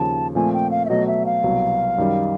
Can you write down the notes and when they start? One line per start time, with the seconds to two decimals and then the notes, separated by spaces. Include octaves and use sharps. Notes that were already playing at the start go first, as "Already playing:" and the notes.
Already playing: D#2 C#3 F3 A5
0.35 A#2 F3 A3 C4 G#5
0.53 G5
0.71 F5
0.85 E5
0.89 B2 F#3 A3 D#5
1.07 E5
1.26 F5
1.43 C2 B2 F#3
1.98 F#2 D#3 G3